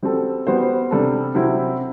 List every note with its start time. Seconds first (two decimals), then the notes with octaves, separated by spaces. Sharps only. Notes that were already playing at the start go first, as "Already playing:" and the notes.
0.03 G3 C4 F#4 A4
0.47 G3 B3 F#4 C5
0.91 C3 G3 D4 A4
1.35 C3 F#3 C4 E4